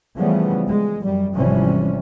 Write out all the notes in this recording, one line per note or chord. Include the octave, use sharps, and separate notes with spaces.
C#3 E3 F3 G3 A3 B3
G#3
F#2 G3
G#1 C3 E3 F3 G3 C#4